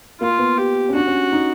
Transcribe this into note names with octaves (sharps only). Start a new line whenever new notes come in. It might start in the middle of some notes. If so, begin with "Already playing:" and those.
A#3 F4
B3
G4
C#4
D4 F#4
C#4
D#4